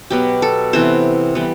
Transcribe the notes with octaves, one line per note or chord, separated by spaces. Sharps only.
B2 F#3 B3 G4
A4
C3 E3 B3 C5
E3 G3 B3